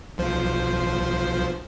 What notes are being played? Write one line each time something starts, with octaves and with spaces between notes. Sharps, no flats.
B1 F3 C5